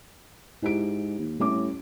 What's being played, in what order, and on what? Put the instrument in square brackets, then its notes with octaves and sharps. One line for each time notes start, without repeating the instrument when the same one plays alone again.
[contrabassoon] G#2 [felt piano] E4 G4 D7
[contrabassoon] D#2
[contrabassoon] A2 [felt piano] G3 C#4 D6